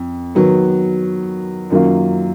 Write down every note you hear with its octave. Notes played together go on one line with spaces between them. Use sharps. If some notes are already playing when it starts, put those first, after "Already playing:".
Already playing: F2
D#3 F#3 B3
F#2 D#3 F#3 A#3 F4